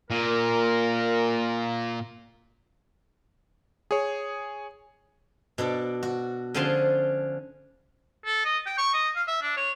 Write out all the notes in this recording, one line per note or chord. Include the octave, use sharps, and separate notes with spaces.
A#2 A#3 A#4
G#4 C#5
B2 D4 A4
F#4
D3 F3 C#4 G#4 A5 C6
A4
D#5
G5
C#6
D#5
F5
E5
D4
C#5